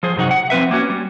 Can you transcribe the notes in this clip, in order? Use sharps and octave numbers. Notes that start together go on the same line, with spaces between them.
F3 G#4 C5
F#2 C3 D#4 F#4
F#5
F3 C4 B4 E5
A#3 C#4 F#4
G3